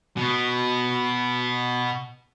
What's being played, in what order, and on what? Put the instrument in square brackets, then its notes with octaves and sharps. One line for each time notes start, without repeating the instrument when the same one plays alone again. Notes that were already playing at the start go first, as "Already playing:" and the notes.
[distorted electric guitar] B2 B3